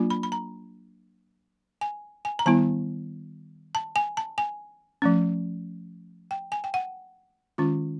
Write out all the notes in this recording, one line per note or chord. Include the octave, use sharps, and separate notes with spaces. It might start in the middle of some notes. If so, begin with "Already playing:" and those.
Already playing: F#3 A#3 D4 F4
B5
B5
A#5
G#5
G#5
A#5
D#3 G3 B3 E4 A5
A5
G#5
A5
G#5
F3 A3 C#4
G5
G#5
G5
F#5
D#3 G#3 C#4 F4